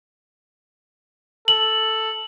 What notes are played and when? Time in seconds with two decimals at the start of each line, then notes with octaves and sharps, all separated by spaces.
1.48 A4 F#7